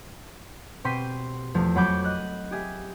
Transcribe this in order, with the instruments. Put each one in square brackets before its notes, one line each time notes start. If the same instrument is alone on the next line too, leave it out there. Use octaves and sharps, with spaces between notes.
[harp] B2 C4 G4 C6 B6 D#7
E2 F3 A3
F2 F#3 F#5 B5 D6 G6
D#5 F#6 G6
G4 G#4 E5